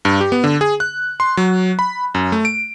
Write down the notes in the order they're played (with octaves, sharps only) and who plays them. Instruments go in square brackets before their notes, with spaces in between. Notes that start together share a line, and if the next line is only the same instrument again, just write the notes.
[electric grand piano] G2
G4
B3
D3
G#4
F#6
C6
F#3
B5
F#2
A3
D7